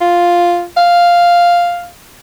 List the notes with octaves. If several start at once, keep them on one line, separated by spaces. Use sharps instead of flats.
F4
F5